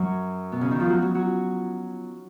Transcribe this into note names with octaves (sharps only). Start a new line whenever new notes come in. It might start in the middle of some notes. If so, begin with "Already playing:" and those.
Already playing: F#2 F#3
B2 B3
C#3 C#4
D#3 D#4
F3 F4
F#3 F#4
F#3 F#4
F#3 F#4